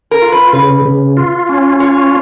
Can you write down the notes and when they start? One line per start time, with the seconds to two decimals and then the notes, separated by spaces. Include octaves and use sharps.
0.11 A#4
0.22 F4
0.32 B4
0.53 C#3 B4
0.85 C#3
1.17 F4
1.49 C#4
1.80 F4 C#5